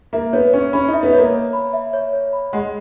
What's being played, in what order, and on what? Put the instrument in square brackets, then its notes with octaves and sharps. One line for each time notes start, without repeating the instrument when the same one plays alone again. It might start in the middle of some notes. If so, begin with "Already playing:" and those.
[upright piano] A#3 [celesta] E5
[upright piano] B3 [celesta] C#5
[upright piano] C#4 [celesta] C#5
[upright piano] C#4 [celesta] B5
[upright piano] D#4 [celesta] E5
[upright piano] B3
[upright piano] A#3 [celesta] C#5
[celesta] C#5
B5
E5
C#5
C#5
B5
[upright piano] G#3 [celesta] F#5